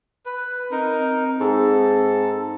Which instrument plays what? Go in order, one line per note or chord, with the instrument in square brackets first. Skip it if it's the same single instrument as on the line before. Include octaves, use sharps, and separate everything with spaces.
[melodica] B4
[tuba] C4 [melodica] D#4 A#4
[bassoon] G#2 [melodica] A4